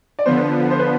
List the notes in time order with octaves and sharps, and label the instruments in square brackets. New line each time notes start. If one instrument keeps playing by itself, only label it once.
[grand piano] D5
[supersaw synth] D3 F3 B3 [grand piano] C5
[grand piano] C5
B4